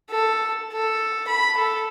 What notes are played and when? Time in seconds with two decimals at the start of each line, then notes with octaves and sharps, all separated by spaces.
0.10 A4
0.73 A4
1.28 B5
1.58 A4